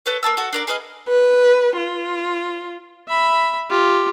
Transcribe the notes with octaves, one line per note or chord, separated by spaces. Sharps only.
A4 B4 C#5
A#3 F4 A5 E6
F#4 A4
D4 A#4 D5
G#4 B4 D#5 F5
B4
F4
E5 B5
F4 G4